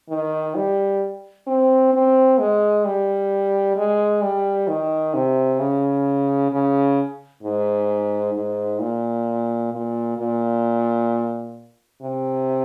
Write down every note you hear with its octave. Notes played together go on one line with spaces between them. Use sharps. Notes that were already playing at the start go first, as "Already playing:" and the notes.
D#3
G3
C4
C4
G#3
G3
G#3
G3
D#3
C3
C#3
C#3
G#2
G#2
A#2
A#2
A#2
C3